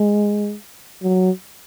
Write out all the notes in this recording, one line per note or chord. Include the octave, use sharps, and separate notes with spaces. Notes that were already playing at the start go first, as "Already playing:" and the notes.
Already playing: G#3
F#3